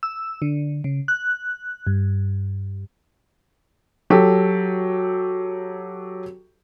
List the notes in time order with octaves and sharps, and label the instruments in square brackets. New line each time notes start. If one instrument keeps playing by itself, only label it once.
[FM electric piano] E6
D3
C#3
F#6
G2
[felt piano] F#3 G4 A4